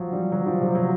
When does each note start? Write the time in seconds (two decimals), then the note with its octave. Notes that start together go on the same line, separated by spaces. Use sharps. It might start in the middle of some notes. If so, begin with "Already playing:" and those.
Already playing: F3 F#3
0.13 G3
0.32 F#3
0.46 F3
0.61 C3
0.75 F#3